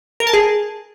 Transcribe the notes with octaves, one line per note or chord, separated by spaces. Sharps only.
A#4
A5
G#4